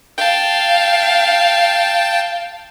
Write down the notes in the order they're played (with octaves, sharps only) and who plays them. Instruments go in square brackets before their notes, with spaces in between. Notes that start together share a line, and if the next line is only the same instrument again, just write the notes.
[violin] F5 [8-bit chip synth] G5 A5